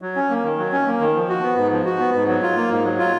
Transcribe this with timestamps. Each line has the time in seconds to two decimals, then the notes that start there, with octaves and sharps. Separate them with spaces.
0.02 F#3
0.16 C#4
0.30 A#3
0.44 D#3
0.58 F#3
0.72 C#4
0.86 A#3
1.00 D#3
1.15 F3
1.29 F#4
1.43 B3
1.57 G#2
1.71 F3
1.86 F#4
1.99 B3
2.14 G#2
2.28 F#3
2.42 F4
2.56 A#3
2.71 G#2
2.85 F#3
2.99 F4